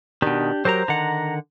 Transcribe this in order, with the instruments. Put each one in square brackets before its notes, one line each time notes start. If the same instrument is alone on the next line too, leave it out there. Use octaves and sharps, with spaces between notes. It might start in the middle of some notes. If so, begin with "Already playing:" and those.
[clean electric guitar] B2 D#3 [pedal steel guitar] D4 G4
[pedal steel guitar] F#3 G4 A#4 [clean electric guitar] C5 A#5
[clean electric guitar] D3 D#3 F#5 [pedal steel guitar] A#5